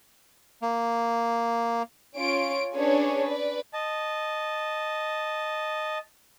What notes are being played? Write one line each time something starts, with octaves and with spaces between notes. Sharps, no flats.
A#3
C#4 F4 C#5 D7
C#4 D4 G#4 B4 C#5
B4 D5
D#5 A5